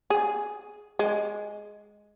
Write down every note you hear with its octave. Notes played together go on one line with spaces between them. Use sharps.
G#4
G#3